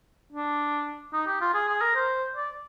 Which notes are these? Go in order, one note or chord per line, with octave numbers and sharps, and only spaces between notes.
D4
D#4
G4
F4
G#4
G#4
A#4
C5
D5